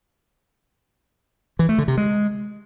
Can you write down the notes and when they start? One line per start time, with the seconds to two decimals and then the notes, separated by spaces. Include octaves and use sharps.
1.59 E3
1.69 A3
1.78 D3
1.88 C3
1.97 G#3